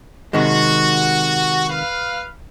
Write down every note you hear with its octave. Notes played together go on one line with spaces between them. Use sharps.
C3 D#3 G#3 F#4
B4 F5